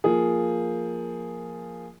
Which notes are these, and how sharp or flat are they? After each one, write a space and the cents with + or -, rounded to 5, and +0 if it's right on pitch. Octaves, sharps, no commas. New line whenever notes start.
F3 +0 A#3 +0 G#4 +0